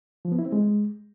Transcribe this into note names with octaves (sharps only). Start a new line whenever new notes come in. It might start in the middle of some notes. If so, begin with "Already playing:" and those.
F3
B3
E4
C4
G#3